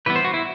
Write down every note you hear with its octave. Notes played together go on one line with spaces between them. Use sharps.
E3 G3 B3 B4
C5
F#4
E4